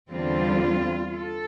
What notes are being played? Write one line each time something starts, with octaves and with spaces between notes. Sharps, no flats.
E2 D3 G3 C4 F4
A4